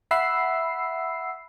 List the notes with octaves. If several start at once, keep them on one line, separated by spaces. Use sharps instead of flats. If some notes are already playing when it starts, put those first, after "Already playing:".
E5 F#5 B5 E6 C7